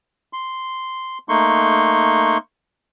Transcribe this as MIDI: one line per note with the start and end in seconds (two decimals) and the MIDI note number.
0.33 1.18 84
1.29 2.37 57
1.29 2.37 58
1.29 2.37 63
1.29 2.37 84
1.29 2.37 85